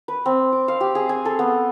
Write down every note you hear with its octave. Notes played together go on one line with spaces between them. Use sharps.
B4
C4
D6
F5
G4
G#4
G#5
A4
B3